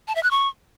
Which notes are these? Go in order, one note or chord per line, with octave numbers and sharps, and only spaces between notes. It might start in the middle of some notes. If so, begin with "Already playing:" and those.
A5
E5
F#6
C#6